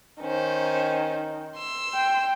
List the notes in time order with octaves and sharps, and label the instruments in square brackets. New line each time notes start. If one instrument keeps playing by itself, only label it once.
[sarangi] D#3 [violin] C#4 C5
[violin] C6 E6
[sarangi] G5